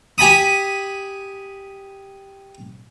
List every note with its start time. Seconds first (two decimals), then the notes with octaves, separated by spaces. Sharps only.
0.18 G4 G#5 B5 D#6